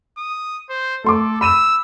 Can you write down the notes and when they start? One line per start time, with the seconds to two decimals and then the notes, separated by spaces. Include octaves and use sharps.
0.18 D#6
0.69 C5
1.04 A3 A4 C6 D6
1.41 B5 E6 D#7 E7